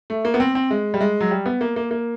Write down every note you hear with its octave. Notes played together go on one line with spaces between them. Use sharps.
A3
A#3
B3
C4
C4
G#3
G3
G#3
F#3
G3
B3
A#3
A#3
A#3